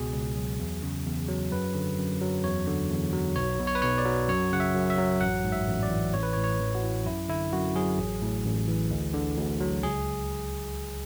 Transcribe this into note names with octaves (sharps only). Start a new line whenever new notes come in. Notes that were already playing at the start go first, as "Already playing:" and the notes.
Already playing: C#2 B2 G#4
C#2
F#3
E2
C#3
E2
F#3
F#2 B4
D3
F#2
F#3
E2 C#5
D3
E2
F#3
B1 C#5
B2
C#5
B4
B1 C#5
D5
F#3
F#2 C#5
C#3 F#5
E5
F#2
E5
F#3
A1 F#5
G#2
E5
A1
D5
E3
A1 C#5
B4
C#5
A2
C#5
A1
F#4
E3
F#2 E4
D3 E4
F#2 F#4
F#3 G#4
A1
A2
A1
E3
D2
D3
D2
F#3
C#2 G#4